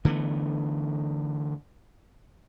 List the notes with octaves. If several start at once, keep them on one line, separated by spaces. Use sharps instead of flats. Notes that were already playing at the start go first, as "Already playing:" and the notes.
D3 E3 A3 B3